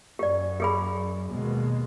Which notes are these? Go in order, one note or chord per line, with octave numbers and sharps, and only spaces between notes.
F#2 G4 D5
G4 G#4 B5
D#2 B2 G#3